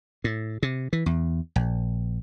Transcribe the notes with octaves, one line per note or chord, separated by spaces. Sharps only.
A2
C3
E3
E2
A#1